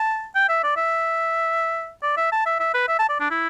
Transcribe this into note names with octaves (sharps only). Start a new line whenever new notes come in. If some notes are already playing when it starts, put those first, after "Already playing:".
Already playing: A5
G5
E5
D5
E5
D5
E5
A5
E5
E5
B4
E5
A5
D5
D4
E4